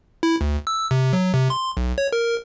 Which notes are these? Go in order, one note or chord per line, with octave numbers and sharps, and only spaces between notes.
E4
D2
E6
C3
F#3
C3
C6
B1
C#5
A#4